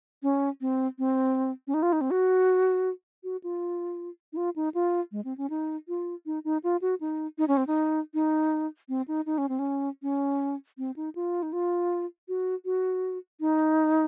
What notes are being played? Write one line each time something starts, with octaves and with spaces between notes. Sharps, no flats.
C#4
C4
C4
C#4
D#4
F4
D#4
C4
F#4
F#4
F4
D#4
F4
D#4
F4
G#3
C4
C#4
D#4
F4
D#4
D#4
F4
F#4
D#4
D#4
C#4
C4
D#4
D#4
C4
D#4
D#4
C#4
C4
C#4
C#4
C4
D#4
F4
D#4
F4
F#4
F#4
D#4